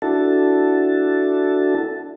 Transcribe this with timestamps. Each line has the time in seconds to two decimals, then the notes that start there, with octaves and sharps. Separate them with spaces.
0.02 D4 E4 F#4 A4 A5